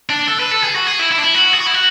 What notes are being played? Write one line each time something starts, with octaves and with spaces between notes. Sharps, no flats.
D4
A4
B4
A4
G#4
F#4
G#4
E4
E4
D4
E4
F#4
G#4
F#4
E4
F#4